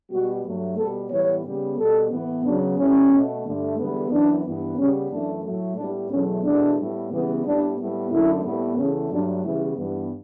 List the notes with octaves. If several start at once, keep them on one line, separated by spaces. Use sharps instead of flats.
B2 G3 B3 F#4
G2 F#3 A3
B2 G3 B3 A4
A2 E3 G3 B3 C#5
C#3 G3 B3
B2 G3 B3 A4
A2 E3 B3
C#3 F#3 B3 D4
A2 G3 B3 C#4
B2 A3
G2 D3 A3
E2 D3 G3 B3
F#2 E3 B3 D4
G2 E3 B3
C#3 G3 B3 C#4
F#2 E3 A3 D4
A2 F#3 A3
A2 G3 B3 D4
E2 B2 F#3 A3 C#4
E2 B2 A3 D4
A2 G3 B3
C#3 E3 G3 B3
A2 G3 B3 D4
A2 G3 B3
F#2 D3 A3 E4
A2 G3 B3
E2 C#3 E3 A3 C#4
G2 F#3 A3 D4
C#3 E3 G3 B3 E4
G2 E3 G3 B3